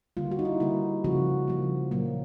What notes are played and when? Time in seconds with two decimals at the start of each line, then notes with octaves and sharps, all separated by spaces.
0.17 D3 G3 A#3 F4
0.31 F#4
0.39 D#4
0.45 E4
0.60 D3 G3 A#3 E4
1.04 C#3 F3 A#3 F#4
1.48 C#3 F3 A#3
1.91 A#2 F#3 A#3